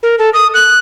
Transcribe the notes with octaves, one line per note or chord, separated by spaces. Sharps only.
A#4
A4
D#6
F#6